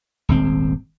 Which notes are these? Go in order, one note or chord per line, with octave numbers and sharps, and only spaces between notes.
D#1 G#1 C4